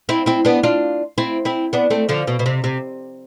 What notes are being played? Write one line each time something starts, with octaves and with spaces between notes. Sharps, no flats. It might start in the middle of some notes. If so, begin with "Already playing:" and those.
C4 E4
C4 E4
B3 D4
D4 F4
C4 E4
C4 E4
B3 D4
A3 C4
D3 F3
B2
B2
C3
C3